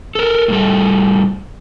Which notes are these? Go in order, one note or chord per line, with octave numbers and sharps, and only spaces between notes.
A4 A#4
A2 G3 A4